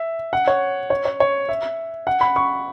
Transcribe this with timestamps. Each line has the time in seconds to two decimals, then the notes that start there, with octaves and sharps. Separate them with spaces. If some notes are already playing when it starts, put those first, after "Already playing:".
Already playing: E5
0.33 F#5
0.47 C#5
0.90 C#5
1.05 C#5
1.20 C#5
1.49 E5
2.07 F#5
2.21 B5
2.36 C#6